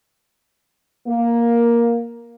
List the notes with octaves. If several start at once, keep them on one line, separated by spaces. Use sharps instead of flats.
A#3